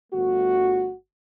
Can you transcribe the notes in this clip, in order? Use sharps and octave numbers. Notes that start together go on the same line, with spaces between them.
G1 A3 F#4